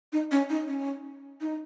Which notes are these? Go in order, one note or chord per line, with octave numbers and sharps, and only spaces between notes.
D#4
C#4
D#4
C#4
D#4